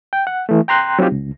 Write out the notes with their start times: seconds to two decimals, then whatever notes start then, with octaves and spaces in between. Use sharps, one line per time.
0.13 G5
0.27 F#5
0.49 E3 A3
0.68 G5 A#5 C6 F#6
0.99 F#3 C4 D#4 F4 G4
1.12 C#2